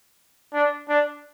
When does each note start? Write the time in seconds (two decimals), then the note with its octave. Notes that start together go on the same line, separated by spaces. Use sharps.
0.53 D4
0.89 D4